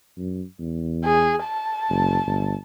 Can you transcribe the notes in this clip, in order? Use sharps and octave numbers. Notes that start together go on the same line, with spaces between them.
F#2
E2
G#4
A5
F#1
G1